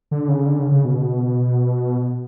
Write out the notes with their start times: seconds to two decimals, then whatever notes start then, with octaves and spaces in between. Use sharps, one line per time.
0.11 D3
0.28 C#3
0.46 D3
0.59 C#3
0.71 C#3
0.85 B2
0.98 B2